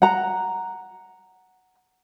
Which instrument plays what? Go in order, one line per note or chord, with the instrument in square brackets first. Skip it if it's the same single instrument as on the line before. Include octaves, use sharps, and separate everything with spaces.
[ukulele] F#5 A#5